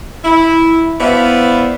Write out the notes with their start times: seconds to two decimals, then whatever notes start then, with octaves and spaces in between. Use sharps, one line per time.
0.25 E4
1.00 B3 E4 C5 D5 E5 F5